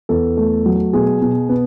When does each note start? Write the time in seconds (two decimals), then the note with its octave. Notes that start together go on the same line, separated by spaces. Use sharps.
0.09 E2 A4
0.37 A3
0.66 F#3
0.93 B2 G#4
1.21 B2
1.49 B3